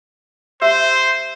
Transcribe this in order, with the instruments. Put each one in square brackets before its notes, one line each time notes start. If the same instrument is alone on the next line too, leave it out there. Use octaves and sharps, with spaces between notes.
[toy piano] G4 E5 E6 [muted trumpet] C5